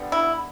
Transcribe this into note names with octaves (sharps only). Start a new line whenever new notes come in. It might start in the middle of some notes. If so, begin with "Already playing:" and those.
Already playing: D3 G3 B3
E4